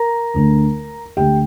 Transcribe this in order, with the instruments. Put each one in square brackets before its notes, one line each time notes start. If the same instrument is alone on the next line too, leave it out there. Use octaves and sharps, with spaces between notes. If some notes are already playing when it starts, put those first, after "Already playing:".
Already playing: [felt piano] A#4 A#5
D2 D3 A3
D2 D3 A3 G4 G5